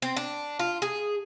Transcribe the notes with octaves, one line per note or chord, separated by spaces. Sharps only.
C4
D4
F4
G#4